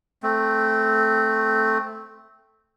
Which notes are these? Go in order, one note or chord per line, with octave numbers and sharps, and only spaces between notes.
A3 C4